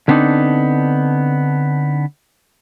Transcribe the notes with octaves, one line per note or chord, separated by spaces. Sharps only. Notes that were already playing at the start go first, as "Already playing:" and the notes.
D3 B3 C4 D4 D#4